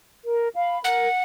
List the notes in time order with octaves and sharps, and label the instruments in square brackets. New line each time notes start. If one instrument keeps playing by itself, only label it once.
[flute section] A#4
F5 B5
[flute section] A#4 [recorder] F#5